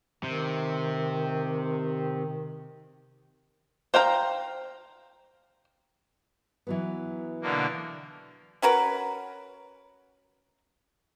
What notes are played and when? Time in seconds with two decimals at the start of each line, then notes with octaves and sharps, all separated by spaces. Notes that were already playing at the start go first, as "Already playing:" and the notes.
0.23 C3 D#3
3.94 C5 F5 G5 A#5
6.67 E3 F#3 B3
7.42 B2 D3 A#3
8.62 C#4 F#4 A#4 B4